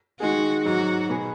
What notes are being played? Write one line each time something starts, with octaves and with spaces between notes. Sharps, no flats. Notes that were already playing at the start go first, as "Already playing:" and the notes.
D#3 G#3 D#4 F#4 G#4
G#2 F#3 D#4 F#4
B2 B3 G#4